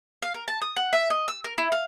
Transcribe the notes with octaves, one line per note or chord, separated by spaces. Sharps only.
F5
A#4
A5
D#6
F#5
E5
D#5
E6
A#4
E4
F5